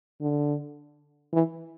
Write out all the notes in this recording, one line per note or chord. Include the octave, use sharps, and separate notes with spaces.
D3
E3